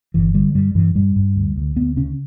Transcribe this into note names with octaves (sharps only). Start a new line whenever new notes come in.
G1 E3
D3 G3
G2 G3
G2 E3
G2 G3
G2
D2
D2
D2 B3
C#3 C#4